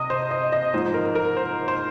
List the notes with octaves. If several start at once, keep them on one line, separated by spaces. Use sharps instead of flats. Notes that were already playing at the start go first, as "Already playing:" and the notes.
Already playing: C3 D#5 D#6
C5
D#5
D#5
G#2 F3 C5
A#4
A#4
C5
C5